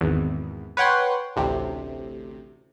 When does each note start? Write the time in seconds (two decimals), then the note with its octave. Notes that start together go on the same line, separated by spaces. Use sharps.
0.01 G#1 E2
0.77 B4 C#5 F#5 G5 C6
1.36 A1 D2 C3